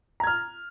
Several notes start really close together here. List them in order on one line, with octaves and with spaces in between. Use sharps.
A#5 G#6 F6